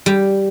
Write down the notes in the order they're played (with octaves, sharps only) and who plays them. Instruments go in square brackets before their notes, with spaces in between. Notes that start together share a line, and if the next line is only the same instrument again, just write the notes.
[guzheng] G3